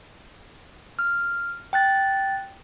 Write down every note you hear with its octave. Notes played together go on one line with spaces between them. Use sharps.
F6
G5 F#6 A6